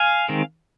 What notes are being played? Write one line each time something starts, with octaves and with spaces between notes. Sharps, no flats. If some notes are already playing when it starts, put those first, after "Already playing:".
Already playing: F5 G#5
D#3 G#3 C4